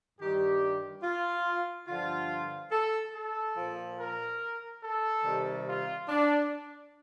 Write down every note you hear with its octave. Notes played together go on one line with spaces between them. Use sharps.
G2 D#3 G3 G4
F4
G2 D3 F3 F4
A4
A4
A#2 F3
A#4
A4
C3 D#3 G3
F4
D4